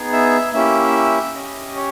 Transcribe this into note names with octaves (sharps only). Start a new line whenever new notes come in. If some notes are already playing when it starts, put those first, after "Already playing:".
Already playing: B3 D#4 G#4
E5
A#3 C#4 E4 G4 E5
C#4 G4 D#5
C#5